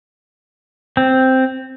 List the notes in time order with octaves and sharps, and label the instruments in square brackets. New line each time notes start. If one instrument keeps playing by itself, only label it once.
[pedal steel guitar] C4